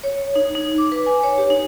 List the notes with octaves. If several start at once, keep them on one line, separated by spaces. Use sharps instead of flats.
C#5
D#4
D#4
D6
B4
G#5
C#5
G4
D#4